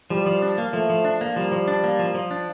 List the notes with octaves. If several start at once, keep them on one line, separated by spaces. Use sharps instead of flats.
F3 G3
F3
D4
A#3
F3 A3
F3
D4
A#3
F3 G3
F3
D4
A#3
F3
F3
D4